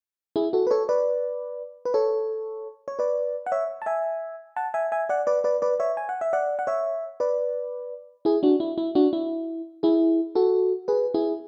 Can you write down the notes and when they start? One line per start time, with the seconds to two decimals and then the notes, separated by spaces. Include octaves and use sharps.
0.36 E4 G#4
0.53 F#4 A4
0.67 B4
0.71 A4 C#5
0.89 B4 D5
1.85 B4
1.94 A4 C#5
2.88 C#5
2.99 B4 D5
3.46 F#5
3.52 C#5 E5
3.82 A5
3.86 E5 G#5
4.56 F#5 A5
4.74 E5 G#5
4.92 E5 G#5
5.09 D5 F#5
5.27 B4 D5
5.44 B4 D5
5.62 B4 D5
5.80 C#5 E5
5.97 G#5
6.09 F#5
6.21 E5
6.33 D5 F#5
6.59 F#5
6.67 C#5 E5
7.20 B4 D5
8.25 E4 G#4
8.43 D4 F#4
8.60 E4
8.78 E4
8.95 D4 F#4
9.13 E4
9.83 E4 G#4
10.35 F#4 A4
10.88 G#4 B4
11.14 E4 G#4